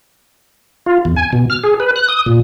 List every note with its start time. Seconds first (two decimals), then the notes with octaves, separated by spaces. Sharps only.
0.86 F4
1.05 E2
1.16 G#5
1.33 B2
1.50 F6
1.64 G#4
1.80 B4
1.96 F#6
2.08 D#6
2.26 A#2